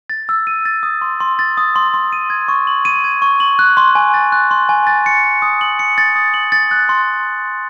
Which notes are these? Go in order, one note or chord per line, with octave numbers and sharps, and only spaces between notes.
A6
E6
D#7
A6
D#6
C6
C6
A6
D#6
C6
C6
D#7
G#6
C#6
F#7
D#7
G#6
C#6
F#7
F#6
C6
G#5
A6
F#6
C6
G#5
A6
C#7
A6
D#6
F#7
C#7
A6
D#6
F#7
A6
F#6
C6